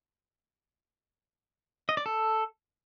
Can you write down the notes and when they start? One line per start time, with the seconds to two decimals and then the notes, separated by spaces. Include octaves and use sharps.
1.89 D#5
1.97 D5
2.06 A4